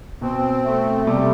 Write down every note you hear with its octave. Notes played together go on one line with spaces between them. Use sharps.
B2 C4
A3
C3 G3